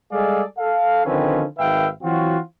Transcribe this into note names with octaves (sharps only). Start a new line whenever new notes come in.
G3 G#3 G#4 A4 D5 F5
A4 F5
D3 D#3 F3 C4 C#4 B4
G#1 D#3 B4 E5 F5 G5
E3 F#3 C4 F4 F#4